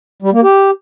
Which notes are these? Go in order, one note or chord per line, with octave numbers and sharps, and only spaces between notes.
G3
A#3
G4